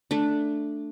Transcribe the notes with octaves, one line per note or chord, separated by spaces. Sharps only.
A3 D4